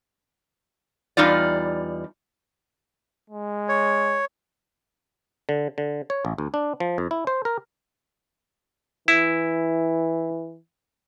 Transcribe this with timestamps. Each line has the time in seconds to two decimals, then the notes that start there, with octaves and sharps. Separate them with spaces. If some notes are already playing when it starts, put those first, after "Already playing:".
1.17 E2 G3 D#4 F4 D5
3.30 G#3
3.69 C#5
5.49 D3
5.78 D3
6.10 C#5
6.25 A1
6.38 D2
6.54 D4
6.80 F3
6.98 F2
7.11 E4
7.27 C5
7.45 A#4
9.08 E3 E4